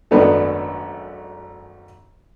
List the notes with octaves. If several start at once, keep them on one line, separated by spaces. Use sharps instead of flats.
G#1 F#2 A3 B3 D4 A4